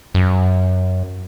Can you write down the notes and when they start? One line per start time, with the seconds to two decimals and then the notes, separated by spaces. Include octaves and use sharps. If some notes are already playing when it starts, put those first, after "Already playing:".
0.14 F#2